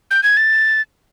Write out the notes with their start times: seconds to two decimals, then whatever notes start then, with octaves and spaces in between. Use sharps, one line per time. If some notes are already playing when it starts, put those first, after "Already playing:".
0.11 G6
0.23 G#6
0.37 A6